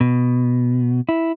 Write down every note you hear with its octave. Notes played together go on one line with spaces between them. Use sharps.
B2
E4